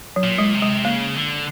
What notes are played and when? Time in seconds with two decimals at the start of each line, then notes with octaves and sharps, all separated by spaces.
0.16 F#3
0.23 A#2
0.38 G#3
0.54 C3
0.62 G#3
0.84 C#3 A#3
1.15 D3